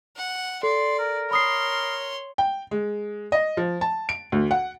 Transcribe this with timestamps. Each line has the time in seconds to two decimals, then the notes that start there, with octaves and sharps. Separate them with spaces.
0.17 F#5
0.63 A4 D5 C6
0.99 A#4
1.31 C#5 B5 C6 D#6 C7
2.38 G5
2.71 G#3
3.32 D#5
3.57 F3
3.81 A5
4.09 D7
4.32 D2
4.51 F#5